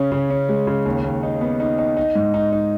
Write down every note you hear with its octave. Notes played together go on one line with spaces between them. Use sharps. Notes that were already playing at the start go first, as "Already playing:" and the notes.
Already playing: C#3 C#4
C#3
C#4
G#3
C#3
D#2
D#2
D#4
B3
D#4
D#4
D#4
G#2
D#4
D#4